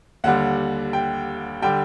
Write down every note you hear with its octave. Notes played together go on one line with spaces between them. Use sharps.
D#2 D3 G3 F#5
G5
D3 G3 G5